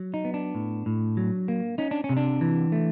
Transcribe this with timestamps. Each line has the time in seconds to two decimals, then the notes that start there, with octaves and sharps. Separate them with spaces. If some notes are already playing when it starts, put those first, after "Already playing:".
Already playing: F#3
0.14 D#4
0.24 B3
0.34 D4
0.55 A2
0.86 A2
1.17 F#3
1.48 A#3
1.78 C#4 D#4
1.91 D4
2.04 C#4
2.09 C3
2.17 D4
2.41 E3
2.72 A3